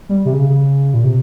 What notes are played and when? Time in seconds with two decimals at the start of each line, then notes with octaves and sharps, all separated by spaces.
0.09 G3
0.25 C3
0.33 C#3
0.50 C#3
0.94 A#2
1.04 C3